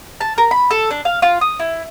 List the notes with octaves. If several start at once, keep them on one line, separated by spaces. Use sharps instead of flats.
A5
A#4
B5
A4
D4
F5
F4
D#6
E4